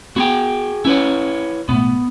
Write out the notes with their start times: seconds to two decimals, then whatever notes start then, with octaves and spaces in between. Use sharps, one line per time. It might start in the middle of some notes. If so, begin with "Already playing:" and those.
0.16 B3 F#4 G#4 G5
0.85 C#4 E4 B4 C#5
1.69 B1 A2 B3